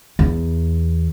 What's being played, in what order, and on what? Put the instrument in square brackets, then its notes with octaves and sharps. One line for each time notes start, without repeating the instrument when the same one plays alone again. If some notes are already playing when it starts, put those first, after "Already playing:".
[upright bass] E2